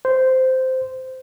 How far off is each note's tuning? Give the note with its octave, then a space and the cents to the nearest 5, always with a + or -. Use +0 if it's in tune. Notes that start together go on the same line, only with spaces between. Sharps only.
C5 -10